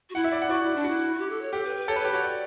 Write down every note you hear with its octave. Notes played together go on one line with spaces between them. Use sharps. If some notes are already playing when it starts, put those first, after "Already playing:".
F#4
E4 F#5
E5
D5
F#5
F#4 D5
E4
D4
E4 F#4
F#4
G4
A4
C#5
G4 A4
B4
B4
A4 C#5
B4
C#5
G4
F#4 C#5
D5